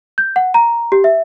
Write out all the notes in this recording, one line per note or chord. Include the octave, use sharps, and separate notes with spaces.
G6
F#5
A#5
G4
E5